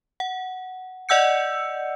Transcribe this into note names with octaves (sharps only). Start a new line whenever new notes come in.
F#5
D5 D#5 F#5 E6 G6 C#7